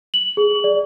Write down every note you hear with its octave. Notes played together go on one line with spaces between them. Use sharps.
F#7
G#4
D5